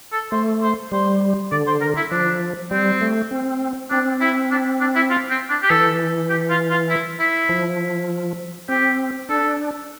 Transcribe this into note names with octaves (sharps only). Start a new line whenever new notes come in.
A4
A3 C5
C5
G3 C5
D3 D5
C5
A#4
E4
F3 D4
G3 C4
A3
C4
C4 D4
E4
D4
D4
E4
F4
C4
D4
G4
E3 A4
G4
F4
F4
E4
E4
F3
C4 G4
D4 A4